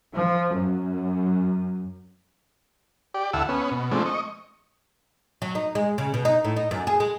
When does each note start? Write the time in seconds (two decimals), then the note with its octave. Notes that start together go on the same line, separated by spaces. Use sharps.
0.14 F3
0.52 F#2
3.14 G4 D5
3.33 D2 E4 A4 F5 F#5 E6
3.49 B3 C#4
3.71 B2
3.91 F3 G#3 A3 C4 D4
4.06 D#5 C#6
5.42 F#3
5.55 D#4
5.75 G#3
5.98 C#3
6.14 B2
6.25 D#4
6.44 A2
6.57 D#4
6.71 F#2
6.87 G#4
7.00 G#3